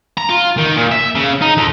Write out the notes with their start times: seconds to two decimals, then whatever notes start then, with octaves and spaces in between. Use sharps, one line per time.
0.18 A#5
0.30 F4
0.58 D#3
0.77 A#2
0.92 E5
1.15 C#3
1.42 D#4
1.57 F2